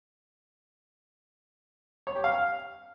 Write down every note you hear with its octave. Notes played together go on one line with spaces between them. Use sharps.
C#5
G4
F5